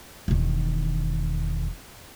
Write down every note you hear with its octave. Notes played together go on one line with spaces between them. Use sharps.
E1 D#3